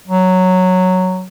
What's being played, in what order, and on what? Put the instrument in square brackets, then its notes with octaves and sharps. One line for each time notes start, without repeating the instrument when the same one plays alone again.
[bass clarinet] F#3